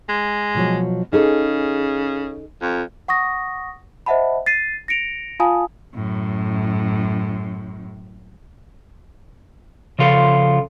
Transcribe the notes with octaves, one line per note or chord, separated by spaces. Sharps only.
G#3
B2 F3 F#3
C#3 D#4 G#4 A4
F2
F#5 C#6 D#6 A#6
C5 D#5 E5 F#5 A5 B5
A6 C7 D#7
A#6 C#7 D7 F7
F4 F5 G#5 A5 D#6
F#2 A2
C#3 F3 F4 A4